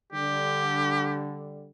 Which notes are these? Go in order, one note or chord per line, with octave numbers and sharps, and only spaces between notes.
D3 G3 G4